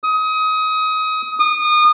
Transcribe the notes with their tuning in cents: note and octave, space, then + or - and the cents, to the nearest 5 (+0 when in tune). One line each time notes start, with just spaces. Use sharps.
D#6 +25
D#6 -30